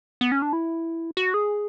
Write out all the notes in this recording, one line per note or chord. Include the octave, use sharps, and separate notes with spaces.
B3
C#4
D4
E4
F#4
G#4